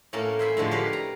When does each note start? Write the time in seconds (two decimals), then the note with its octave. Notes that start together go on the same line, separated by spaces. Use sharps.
0.13 A2 A#3 C#4 A#4 F#5 A5
0.39 C5 E5 G#5 B5
0.57 A2 D3 F3 G#3
0.71 G4 A#4 B4 C#5 D5 F5
0.93 A#5